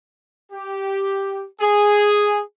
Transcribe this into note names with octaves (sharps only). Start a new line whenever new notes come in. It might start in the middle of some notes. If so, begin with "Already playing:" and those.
G4
G#4